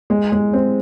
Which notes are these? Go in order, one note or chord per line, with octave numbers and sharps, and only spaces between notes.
G#3
G#3
C4